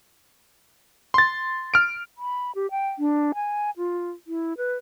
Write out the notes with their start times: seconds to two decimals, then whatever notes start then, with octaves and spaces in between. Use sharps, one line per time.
1.14 C6 A6
1.74 F6 D7
2.18 B5
2.55 G4
2.71 G5
2.99 D4
3.34 G#5
3.77 F4
4.27 E4
4.57 B4